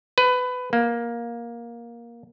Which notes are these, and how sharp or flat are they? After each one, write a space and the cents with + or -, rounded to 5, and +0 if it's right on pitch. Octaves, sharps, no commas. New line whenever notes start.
B4 +20
A#3 +10